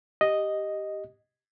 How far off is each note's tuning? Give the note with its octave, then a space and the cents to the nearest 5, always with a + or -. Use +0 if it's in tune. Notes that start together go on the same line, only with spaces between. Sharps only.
G4 +0 D#5 +0